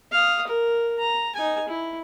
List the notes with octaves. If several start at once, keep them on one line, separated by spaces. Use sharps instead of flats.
F5 D#6
A#4
A#5
D#4 G#5
E4